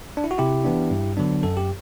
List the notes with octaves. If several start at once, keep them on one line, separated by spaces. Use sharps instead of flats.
D4
E4
F#4
C3 E4 G4
E3 B3 D4
G2
D3 F#3 B3 D4
F#2 A4
G4